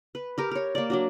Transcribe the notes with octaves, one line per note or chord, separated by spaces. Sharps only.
B4
G4 A#4
A#4 C#5
A#3 D5
F#3 D4 F#4